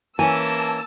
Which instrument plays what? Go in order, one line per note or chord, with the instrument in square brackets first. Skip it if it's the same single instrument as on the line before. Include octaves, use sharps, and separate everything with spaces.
[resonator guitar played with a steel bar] E3 C#4 [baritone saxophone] A#3 [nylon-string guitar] G#5 [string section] A5 E6